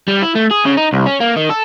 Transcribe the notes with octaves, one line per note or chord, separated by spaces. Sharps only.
G3
E4
A3
G#4
C#3
D#4
C2
C#4
A#3
D#3
A4